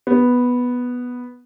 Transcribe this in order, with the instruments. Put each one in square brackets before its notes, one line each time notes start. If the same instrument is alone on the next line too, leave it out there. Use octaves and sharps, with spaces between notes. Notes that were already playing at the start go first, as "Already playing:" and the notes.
[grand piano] B3